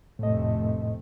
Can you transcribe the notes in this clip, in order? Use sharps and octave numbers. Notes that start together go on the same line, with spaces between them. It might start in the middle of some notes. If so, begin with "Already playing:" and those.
F1 A2 A3 C4 D#5